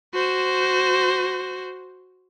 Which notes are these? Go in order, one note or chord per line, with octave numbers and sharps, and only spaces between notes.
F#4 C5